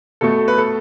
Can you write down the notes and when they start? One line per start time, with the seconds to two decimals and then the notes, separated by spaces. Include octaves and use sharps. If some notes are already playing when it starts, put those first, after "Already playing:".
0.21 B2 A3 A4
0.48 B4
0.58 A4